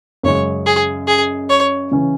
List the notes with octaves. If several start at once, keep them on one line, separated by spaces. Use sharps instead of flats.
F#2 C#3 G#3 C#5
G#4
G#4
C#5
C#3 E3 C#4